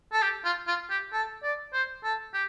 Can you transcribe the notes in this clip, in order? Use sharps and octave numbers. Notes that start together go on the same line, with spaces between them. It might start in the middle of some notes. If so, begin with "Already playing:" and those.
A4
G4
F4
F4
G4
A4
D5
C5
A4
G4